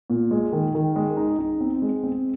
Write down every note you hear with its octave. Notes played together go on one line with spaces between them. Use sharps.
A#2
G#3
D#3
D#3
G#3
D#4
D#4
C4
G#3
C4